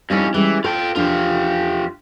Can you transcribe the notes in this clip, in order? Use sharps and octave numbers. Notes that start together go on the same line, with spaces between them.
F2 G3 C#4 D#4 E4
E3 G3 G#3 C#4
F4 A4 G5
E2 F3 D4 F4 G4